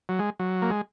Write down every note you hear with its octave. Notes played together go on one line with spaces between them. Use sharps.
F#3
G#3
F#3
A#3
G#3